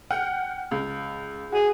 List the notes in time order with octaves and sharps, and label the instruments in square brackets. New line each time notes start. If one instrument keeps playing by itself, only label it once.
[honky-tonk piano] F#5 G5 F6
C#2
[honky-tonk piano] F#4 [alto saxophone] G#4